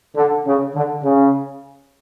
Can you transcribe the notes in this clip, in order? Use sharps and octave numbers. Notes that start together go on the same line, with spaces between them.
D3
C#3
D3
C#3